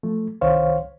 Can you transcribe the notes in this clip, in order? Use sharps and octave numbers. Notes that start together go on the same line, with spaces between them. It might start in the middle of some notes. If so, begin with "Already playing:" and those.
F3 A3
C2 D#3 C5 C#5 F5